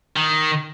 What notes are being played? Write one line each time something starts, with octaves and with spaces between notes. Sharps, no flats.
D#3